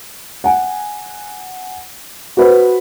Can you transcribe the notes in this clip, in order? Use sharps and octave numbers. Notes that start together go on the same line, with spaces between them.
F#5 G#5
F#4 B4 C5